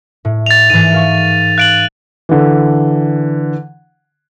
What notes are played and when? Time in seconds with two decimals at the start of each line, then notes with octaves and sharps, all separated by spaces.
0.25 A2
0.46 D#5 A6 F7
0.70 G#2 E3 D#7
0.92 A#4 F5 C#6
1.58 F5 F#6 D7 F#7
2.29 D3 E3